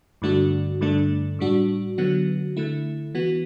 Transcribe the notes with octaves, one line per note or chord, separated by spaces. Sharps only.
G2 D3 A3 D4 F#4
G2 D3 A3 D4
A2 G3 D4 F#4
D3 F#3 B3 F#4
D3 A3 E4
E3 B3 F#4